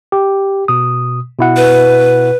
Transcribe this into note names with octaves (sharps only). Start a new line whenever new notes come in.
G4
B2 D#6
B2 E4 F#5
B4